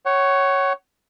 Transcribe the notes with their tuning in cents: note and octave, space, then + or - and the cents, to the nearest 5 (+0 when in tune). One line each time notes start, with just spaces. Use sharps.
C#5 +0 F#5 +35